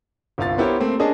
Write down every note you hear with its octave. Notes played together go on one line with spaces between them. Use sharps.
G1 C2 F4 F5 A6
B3 E4 G4 A#4 C5 C#5
A3 A#3 C4
C#4 D4 G#4 A#4 D#5 A5